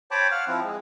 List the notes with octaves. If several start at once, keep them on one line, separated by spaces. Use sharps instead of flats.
C5 C#5 G5 A5 B5 D6
F5 F#5 F6
F3 C4 E4
G#3